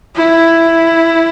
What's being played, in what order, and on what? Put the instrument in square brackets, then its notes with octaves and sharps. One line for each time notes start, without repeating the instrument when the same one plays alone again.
[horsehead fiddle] E4